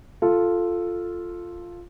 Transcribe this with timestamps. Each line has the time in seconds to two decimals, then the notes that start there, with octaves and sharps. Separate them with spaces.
0.22 F4 A4